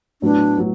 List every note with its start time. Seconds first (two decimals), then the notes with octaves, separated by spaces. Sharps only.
0.22 A2 F#3 B3 D4
0.57 A2 F#3